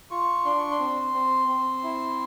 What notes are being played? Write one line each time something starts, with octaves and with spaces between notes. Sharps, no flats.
F4 C#6
D4 C6
C#6
C6
C4
C4
C4
E4